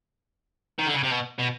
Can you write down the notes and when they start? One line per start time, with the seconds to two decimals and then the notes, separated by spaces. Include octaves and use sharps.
0.79 D#3
0.87 D3
0.94 C#3
1.03 C3
1.11 B2
1.39 B2